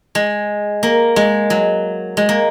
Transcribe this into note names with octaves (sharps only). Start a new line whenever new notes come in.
G#3
A#3
G#3
F#3
G#3
A#3